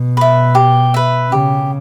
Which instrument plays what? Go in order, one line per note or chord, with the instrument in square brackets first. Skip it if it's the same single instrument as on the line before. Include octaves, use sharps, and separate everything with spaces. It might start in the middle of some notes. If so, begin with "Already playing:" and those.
Already playing: [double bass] B2
[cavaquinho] B4 E5
G4
B4 E5
[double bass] C#3 [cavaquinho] G4